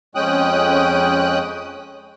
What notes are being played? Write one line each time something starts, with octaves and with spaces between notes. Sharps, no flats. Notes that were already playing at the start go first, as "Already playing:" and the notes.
F2 G#3 C#4 G5 D#6 F#6